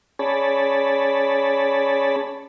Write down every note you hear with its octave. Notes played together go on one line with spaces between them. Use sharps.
C#4 G#4 C#5 D5 A5 B5